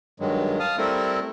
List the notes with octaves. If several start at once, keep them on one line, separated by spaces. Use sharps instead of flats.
G2 D#3 F#3 G#3
F5 A5 D#6 F6
G3 A3 C4 E4 A4 A#4